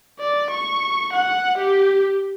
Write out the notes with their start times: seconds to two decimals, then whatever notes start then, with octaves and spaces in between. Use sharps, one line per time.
0.20 D5
0.51 C#6
1.14 F#5
1.58 G4